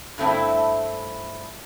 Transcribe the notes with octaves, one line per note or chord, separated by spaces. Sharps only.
G2 A3 C4 E4